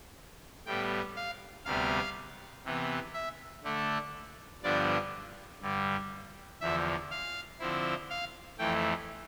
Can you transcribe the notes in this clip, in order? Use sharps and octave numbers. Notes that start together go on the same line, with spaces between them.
A2 G3 B3 G5
F5
D2 C3 G3 B3 F5
C3 E3 B3
E5
D3 A3 D4
G2 D3 F3 B3 D4 D5
G2 D3 G3
E2 D3 F3 E5
F5
D3 F3 C4 E4
F5
F2 E3 A3 G5